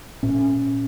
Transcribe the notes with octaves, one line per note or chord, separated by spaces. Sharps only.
A#2 C#4